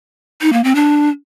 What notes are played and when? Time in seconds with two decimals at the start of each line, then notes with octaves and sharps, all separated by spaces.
0.41 D#4
0.53 A#3
0.64 C4
0.75 D4